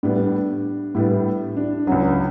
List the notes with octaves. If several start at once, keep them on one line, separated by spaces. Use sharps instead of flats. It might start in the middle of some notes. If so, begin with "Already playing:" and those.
A2 G3 B3 D4
A2 G3 B3 E4
D4
C#2 C#3 F#3 C#4